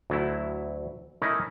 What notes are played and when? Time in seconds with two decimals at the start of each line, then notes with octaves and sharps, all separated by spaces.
0.10 D2 F#3 A3 E4
1.22 A3 C#4 D#4 E4 A#4 D#5